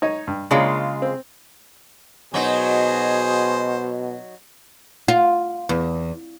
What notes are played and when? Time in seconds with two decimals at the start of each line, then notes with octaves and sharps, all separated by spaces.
0.02 D#4 C#5 D#5
0.27 G2
0.51 C#3 G#3 A#3 C#4 D4 F4
1.02 C4
2.34 B2 F#3 D#4 G#4 C5
5.08 F4
5.69 E2